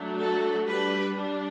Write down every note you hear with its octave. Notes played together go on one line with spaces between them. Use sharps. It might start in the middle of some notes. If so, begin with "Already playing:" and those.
Already playing: F#3 A3 D4
F#4 A4
G3 D4 G4 B4
D4